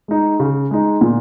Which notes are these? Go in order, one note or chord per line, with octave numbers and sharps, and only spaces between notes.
G#3 D#4
C#3
G#3 D#4
A#2